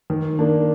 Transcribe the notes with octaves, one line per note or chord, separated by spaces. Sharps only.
D#3
A#3 D4